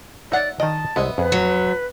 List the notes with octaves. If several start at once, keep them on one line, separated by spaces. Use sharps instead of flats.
D#4 C#5 D5 E5 F#5
D#3 D5 D#5 G5 A5
C2 G#3 B3 E4 D#5 E5
F2 G#4 B4
F#3